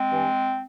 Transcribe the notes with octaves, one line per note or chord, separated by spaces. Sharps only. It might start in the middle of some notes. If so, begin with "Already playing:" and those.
Already playing: G#3 C4
G2 E3